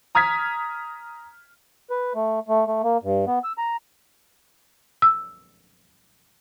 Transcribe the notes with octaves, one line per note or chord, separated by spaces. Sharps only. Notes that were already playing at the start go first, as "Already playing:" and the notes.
A#5 D#6 F6 G#6 B6
B4
A3
A3
A3
A#3
G2
B3
E6
A#5
E6